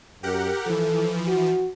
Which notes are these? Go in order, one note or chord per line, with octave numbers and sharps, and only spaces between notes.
F#2 G4 A#4 F#5
E3 F3 A4
F#4